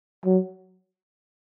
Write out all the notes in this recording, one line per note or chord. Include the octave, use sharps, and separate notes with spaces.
F#3